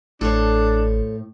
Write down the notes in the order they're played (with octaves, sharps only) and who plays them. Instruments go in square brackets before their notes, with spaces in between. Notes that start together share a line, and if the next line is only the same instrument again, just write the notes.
[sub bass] A1 [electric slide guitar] A2 [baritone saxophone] D4 [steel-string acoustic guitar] A4 C5 C#5